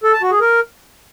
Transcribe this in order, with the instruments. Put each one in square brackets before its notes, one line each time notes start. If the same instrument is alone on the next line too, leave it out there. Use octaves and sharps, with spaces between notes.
[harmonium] A4
A5
F#4
G#4
A#4